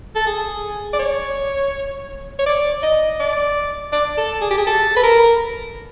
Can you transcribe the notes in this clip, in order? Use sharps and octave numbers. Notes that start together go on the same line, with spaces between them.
A4
G#4
D5
C#5
C#5
D5
D#5
D5
D5
A4
G#4
G4
G#4
A4
B4
A#4